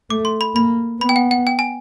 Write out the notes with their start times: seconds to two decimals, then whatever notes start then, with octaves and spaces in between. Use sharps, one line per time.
0.10 A3 D6
0.25 C6
0.41 B5
0.55 A#3 B5
1.01 B3 B5
1.09 G5
1.16 F#5
1.31 F#5
1.47 G5
1.59 G#5